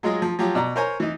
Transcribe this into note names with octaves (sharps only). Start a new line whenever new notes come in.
F#3 G#3 F4 G#4 D#5
F3
F3 F#3 F4 G4
B2 D5 A#5
A#4 C5 C#5 G#5 A#5
E3 D#4